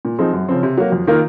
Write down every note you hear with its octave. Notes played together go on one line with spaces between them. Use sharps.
A#2
F3 C4 D#4 G#4
F#2
C#3 F3 C4
C3
F#3 A#3
F2
D#3 A#3 F4 A#4